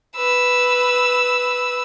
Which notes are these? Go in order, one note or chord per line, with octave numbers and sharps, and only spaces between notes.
B4 E6